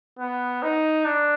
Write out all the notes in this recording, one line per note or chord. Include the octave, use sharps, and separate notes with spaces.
B3
D#4
D4